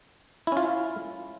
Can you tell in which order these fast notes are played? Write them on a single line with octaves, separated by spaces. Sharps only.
E4 C#4 F4